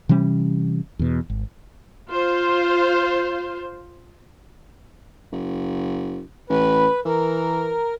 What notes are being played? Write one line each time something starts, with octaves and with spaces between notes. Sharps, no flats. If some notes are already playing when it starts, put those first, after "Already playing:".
C3 E3 G3 C#4
E2 B2
G#1
F4 C5
F#1
A1 B4
E3 A#4